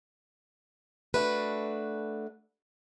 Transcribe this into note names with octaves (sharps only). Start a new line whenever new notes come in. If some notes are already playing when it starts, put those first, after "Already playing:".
A3 D4 F#4 B4